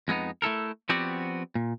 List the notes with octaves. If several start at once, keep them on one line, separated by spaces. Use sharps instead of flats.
F2 G#3 A#3 B3 D#4
A3 E4 A4 A#4
F3 B3 C4 F#4 G4 D5
A#2